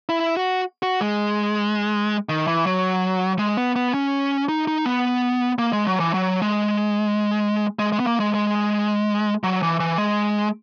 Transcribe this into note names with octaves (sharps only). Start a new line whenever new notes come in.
E4
F#4
F#4
G#3
D#3
E3
F#3
G#3
B3
B3
C#4
D#4
D#4
B3
A#3
G#3
F#3
E3
F#3
G#3
G#3
G#3
B3
A#3
G#3
G#3
F#3
E3
E3
G#3